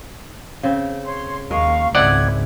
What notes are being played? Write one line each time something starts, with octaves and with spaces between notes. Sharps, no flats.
C#3 C4
C#5 C6
D#2 G#3 A#4 F5 C#6
G#1 C#2 G#3 C4 E4 D5 F#5 G#6